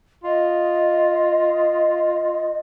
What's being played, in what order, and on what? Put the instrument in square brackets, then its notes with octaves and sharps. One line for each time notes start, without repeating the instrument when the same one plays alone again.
[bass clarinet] F4 [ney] D#5